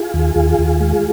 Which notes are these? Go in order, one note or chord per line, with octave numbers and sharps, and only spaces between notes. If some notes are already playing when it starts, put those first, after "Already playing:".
Already playing: F4 G#4
D#2
D#2
D#2
G#3